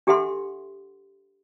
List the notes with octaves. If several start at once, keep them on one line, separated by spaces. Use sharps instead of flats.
D4 G4 A4 E5 F#5 C6